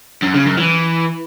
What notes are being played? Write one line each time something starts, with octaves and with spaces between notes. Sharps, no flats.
F#2
C#3
F#2
E3